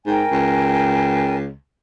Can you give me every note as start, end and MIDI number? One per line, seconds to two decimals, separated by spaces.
0.06 0.23 44
0.06 1.36 70
0.06 1.36 79
0.06 1.36 80
0.31 1.53 37